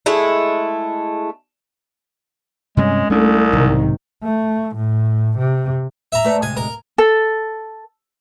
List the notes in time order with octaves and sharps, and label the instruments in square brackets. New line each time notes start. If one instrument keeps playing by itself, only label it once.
[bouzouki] G#3 A3 E4
[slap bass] G2 C3 G3 [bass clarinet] G#3 [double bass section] C#4
[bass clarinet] C2 [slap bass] G#3 C#4 D4 [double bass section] A3
[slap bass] B1 [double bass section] G#2 C3 D#3
[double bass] A3
A2
C3
[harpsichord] E5 A#5
[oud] A3 B4 D5
[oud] D2 C3 G#3 [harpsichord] G#5
[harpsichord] A#4
[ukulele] A4